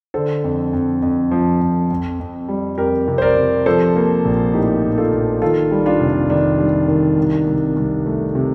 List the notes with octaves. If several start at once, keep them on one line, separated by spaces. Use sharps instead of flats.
D3 A4 C5
F2
F2
F2
F3
F2
F2
F2
G3
F2 G4 A#4
C3
C5
A#4 D5
C3
F3 A4 C5
A#3
A#1
A2 D#4 G4
A#1
F4 A4
A#1
D#3 F4 A4
G3
D4 F4
F1
D#3 D4
G3
D#3
C2
C2
C2
A3
C3